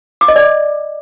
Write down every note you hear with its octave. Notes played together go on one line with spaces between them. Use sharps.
D6
D#5
D5